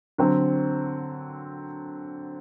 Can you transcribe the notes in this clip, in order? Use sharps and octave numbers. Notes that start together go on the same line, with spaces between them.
D3 F#3 C4